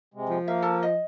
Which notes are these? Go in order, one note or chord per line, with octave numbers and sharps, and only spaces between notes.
C3 G#3
F3
A#3 A#4 E5 F5
A4 A5
D#5